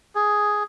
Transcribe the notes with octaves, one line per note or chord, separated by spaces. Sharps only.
G#4